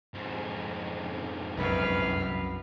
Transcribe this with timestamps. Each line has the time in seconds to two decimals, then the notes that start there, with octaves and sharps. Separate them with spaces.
0.14 F2 G#2
1.57 C2 F#2 B4 F5